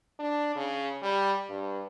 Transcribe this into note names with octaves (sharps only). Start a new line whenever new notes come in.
D4
C#3
G3
G2